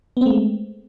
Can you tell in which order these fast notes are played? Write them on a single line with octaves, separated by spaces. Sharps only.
B3 C4 A3 G#3